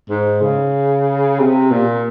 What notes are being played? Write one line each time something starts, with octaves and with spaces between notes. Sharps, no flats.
G#2
C#3
C3
A#2